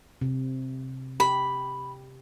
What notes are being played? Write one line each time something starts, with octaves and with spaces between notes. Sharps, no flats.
C3
G4 B5